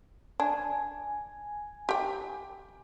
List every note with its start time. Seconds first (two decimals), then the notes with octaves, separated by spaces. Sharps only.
0.40 D4 G#5
1.89 G4 G5